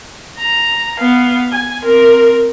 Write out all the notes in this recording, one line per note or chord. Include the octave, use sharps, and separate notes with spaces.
A#5
B3 F5
G#5
C4 A#4